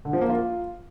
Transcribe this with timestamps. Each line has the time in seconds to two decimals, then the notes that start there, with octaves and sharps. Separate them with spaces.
0.05 D3
0.13 F3
0.21 A#3
0.29 F4